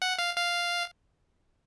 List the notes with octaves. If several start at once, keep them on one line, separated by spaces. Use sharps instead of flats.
F#5
F5
F5